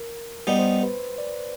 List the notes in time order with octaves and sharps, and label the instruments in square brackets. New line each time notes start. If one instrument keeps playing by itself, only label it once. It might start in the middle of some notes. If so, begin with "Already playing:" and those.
Already playing: [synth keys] A#4
[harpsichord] G3 B3 D#4 [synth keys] B4
[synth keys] C5
B4
D5